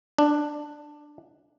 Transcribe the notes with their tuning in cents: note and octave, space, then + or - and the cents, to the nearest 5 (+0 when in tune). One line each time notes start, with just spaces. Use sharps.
D4 +10